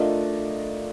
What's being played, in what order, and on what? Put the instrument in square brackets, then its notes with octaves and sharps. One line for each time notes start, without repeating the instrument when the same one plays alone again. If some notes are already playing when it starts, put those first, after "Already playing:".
Already playing: [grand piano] A3 D4 F4 A#4 D#5